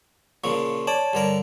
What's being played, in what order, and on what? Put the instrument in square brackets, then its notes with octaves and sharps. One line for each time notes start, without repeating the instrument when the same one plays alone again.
[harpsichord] A#2 C#3 F3 [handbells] C#6
[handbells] C#5 A5 [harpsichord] D5
[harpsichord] G2 D3 A#4